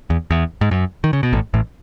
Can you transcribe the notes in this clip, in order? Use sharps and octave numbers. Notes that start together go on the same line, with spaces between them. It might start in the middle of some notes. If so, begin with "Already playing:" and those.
E2
E2
G#2
F#2
D#3
C#3
B2
A1 A2
A1 A2